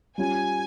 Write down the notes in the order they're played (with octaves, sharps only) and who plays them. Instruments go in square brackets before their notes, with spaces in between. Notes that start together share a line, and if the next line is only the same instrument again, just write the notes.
[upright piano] G3 C#4 F4 [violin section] G#5